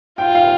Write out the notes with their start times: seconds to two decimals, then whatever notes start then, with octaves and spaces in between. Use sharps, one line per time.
0.18 F4 G5
0.35 F5